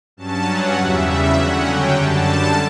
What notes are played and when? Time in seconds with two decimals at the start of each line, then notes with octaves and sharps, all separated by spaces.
0.17 G2 F#3 C#4 A5
0.47 F#5
0.76 E2 C#3 G3 E5
1.06 E5
1.35 D3 F#3 C#4 F#5
1.64 G5
1.94 F#2 D3 G3 A5